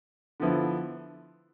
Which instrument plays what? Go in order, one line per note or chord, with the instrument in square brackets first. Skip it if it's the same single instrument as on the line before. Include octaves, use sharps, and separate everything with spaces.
[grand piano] D3 F3 B3 E4